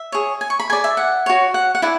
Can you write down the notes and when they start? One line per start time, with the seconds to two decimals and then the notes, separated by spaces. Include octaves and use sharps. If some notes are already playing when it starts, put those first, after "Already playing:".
Already playing: E5
0.12 G#4 C#5
0.41 G#5
0.50 C#6
0.60 B5
0.70 G#4 D5 G#5
0.84 E5
0.97 F#5
1.26 F#4 C#5
1.54 F#5
1.75 F#5
1.82 E4 D5 G#5